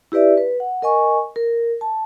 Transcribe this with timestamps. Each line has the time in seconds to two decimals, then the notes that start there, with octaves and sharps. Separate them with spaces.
0.12 E4 G4 B4 D5 E5
0.37 B4
0.60 F#5
0.82 A#4 D#5 G#5 C#6
1.36 A#4
1.81 A5